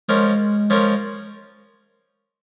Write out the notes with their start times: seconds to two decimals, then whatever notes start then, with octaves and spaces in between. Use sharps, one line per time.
0.08 F3 G#3 C#4 A#4
0.70 F3 C#4 A#4